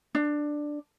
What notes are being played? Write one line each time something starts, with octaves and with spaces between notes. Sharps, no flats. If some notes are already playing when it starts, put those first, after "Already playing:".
D4